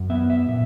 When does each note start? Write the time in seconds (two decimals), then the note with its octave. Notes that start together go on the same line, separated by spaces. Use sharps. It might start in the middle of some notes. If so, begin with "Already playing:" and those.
Already playing: F#2
0.10 B3 E5
0.30 E5
0.48 A#2 E5